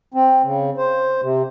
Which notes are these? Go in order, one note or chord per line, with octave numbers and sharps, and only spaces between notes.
C4
C#3
C5
C3